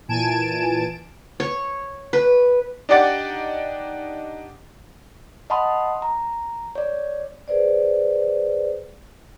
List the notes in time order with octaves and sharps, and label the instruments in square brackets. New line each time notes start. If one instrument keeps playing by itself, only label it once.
[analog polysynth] A#2 E3 G#5 A5 D7 E7
[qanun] C#5
B4
[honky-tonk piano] D4 D#4 G4 D5 F#5 A6
[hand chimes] D#5 F#5 A5 B5 C6 D#6
A#5
C#5 D5
[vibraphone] G#4 B4 C5 D5